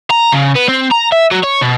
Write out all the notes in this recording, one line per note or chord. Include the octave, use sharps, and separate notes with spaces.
A#5
C#3
B3
C4
A#5
E5
F#3
C#5
B2